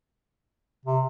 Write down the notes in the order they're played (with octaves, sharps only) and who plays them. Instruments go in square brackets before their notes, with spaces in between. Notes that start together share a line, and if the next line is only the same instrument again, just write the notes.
[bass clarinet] C3